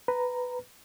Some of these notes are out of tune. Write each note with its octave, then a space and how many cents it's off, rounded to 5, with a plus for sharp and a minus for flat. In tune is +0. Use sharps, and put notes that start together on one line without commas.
B4 +10 A#5 +0